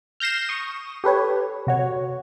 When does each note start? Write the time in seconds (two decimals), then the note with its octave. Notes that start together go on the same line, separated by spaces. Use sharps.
0.20 F6 G6 A#6 C7 E7
0.49 C#6 D#6
1.04 G4 A4 B4 C#5
1.67 C3 F#4 C#5